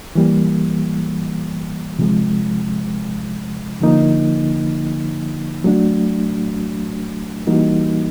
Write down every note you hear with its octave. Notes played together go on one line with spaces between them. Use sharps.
E3 G3 A#3
C3 F3 G#3
D3 F3 A#3 D#4
F#3 A3 D4 F#4
E3 G3 A#3 D#4 F#4